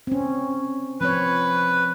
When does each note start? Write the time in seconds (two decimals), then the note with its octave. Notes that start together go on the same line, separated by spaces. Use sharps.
0.07 C4 C#4
1.01 F3 C4 B4 C#5